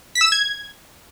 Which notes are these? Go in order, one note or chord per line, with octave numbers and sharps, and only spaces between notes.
B6
E6
E7
G#6